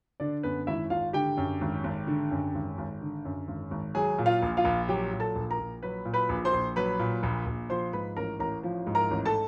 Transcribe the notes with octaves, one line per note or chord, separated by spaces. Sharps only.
D3 D4 D5
F#2 B3 B4
G#1 E4 E5
G#1 F4 F5
D3 G4 G5
F#2
G#1
G#1
D3
F#2
G#1
G#1
D3
F#2
G#1
G#1
F#3 G#4 G#5
A#2
F4 F5
A#1
F4 F5
A#1
F#3 G4 G5
A#2
A4 A5
A#1
A#4 A#5
A#1
F#3 B4 B5
A#2
B4 B5
A#1
C5 C6
A#1
F#3 B4 B5
A#2
A#1
A#1
F3 C5 C6
G#2 B4 B5
A1 A#4 A#5
A1 A#4 A#5
F3
G#2
A#4 A#5
A1
A4 A5